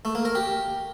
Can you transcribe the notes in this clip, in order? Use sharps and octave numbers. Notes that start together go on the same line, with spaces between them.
A3
A#3
A#4
G4